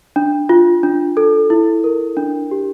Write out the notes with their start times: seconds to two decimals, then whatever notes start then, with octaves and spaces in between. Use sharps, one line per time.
0.16 D4
0.49 F4
0.83 D4
1.17 A4
1.50 E4
1.84 A#4
2.17 D4
2.51 G4